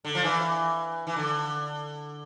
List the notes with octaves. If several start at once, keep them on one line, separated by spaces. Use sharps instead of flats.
D3
F3
E3
E3
D3